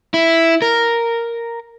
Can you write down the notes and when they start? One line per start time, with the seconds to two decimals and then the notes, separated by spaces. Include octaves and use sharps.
0.14 E4
0.62 A#4